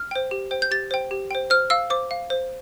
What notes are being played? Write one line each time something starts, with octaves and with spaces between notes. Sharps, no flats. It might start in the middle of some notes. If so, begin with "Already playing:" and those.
Already playing: F6
C5 G5
G4
C5 G5
G6
G4 A6
C5 G5
G4
C5 G5
C5 F6
F5 E6
C5 D6
F5
C5